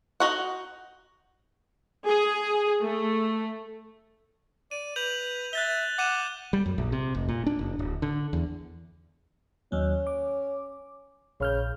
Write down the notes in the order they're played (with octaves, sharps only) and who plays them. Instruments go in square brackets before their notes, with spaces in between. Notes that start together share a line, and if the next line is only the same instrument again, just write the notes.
[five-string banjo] D#4 F#4 F#5
[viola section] G#4
A3
[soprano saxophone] D5 [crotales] D#7
[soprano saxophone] B4 [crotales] G6 F7 F#7
[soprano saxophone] E5 [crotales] F#6 A6 G7
[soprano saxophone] F#5 [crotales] D6 D#7 E7
[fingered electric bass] G3
F#2
A#1
C3
F1
A#2
D4
F#1
D1
D3
E2
[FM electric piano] D#2 F#3 [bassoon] C#4
[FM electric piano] D6
[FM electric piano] A#1 F6 G6 [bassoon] C#3